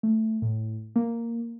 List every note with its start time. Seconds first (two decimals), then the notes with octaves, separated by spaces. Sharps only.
0.03 A3
0.42 A2
0.96 A#3